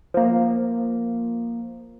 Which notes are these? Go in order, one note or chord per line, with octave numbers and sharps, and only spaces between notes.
F3 A#3